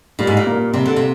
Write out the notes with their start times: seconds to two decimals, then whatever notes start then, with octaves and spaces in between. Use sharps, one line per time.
0.19 A#2 G3
0.27 G#2
0.37 A#2
0.46 A#3
0.74 C3 G3
0.86 D3
0.96 C3